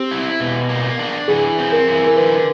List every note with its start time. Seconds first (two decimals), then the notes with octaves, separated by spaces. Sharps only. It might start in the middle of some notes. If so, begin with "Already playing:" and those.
Already playing: C4 G4
0.11 E4
0.40 B2
0.69 A#3
0.99 D4
1.28 E3 G#4
1.59 C4
1.72 A#4
1.87 E3
2.07 A#4
2.16 D3 B4